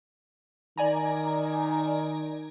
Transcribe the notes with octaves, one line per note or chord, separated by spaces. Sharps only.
D#3 D5 G#5 A#5